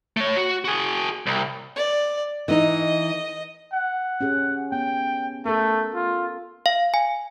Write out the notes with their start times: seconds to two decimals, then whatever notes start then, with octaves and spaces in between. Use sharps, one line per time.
0.17 A3 C#5
0.36 F#4
0.65 F#4 G#4
1.26 C2
1.76 D5
2.48 E3 D#4 D#5
3.73 F#5
4.21 C#4 G4 G#4
4.72 B3 G5
5.46 A3 A4 A#4
5.95 F4
6.66 F5
6.94 G#5